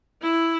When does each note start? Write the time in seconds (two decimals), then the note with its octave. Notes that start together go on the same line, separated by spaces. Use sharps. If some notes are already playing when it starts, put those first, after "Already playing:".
0.22 E4